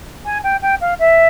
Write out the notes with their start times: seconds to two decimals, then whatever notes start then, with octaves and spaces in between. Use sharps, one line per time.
0.25 G#5
0.43 G5
0.61 G5
0.81 F5
0.99 E5